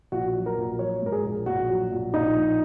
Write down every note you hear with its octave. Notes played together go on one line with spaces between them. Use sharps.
A#1 F#4
F#3
A#4
A#1
F#3 C#5
G#2 A#4
G#4
A#1
A#1 F#4
F#3
A#1
A#1 D#4
A#1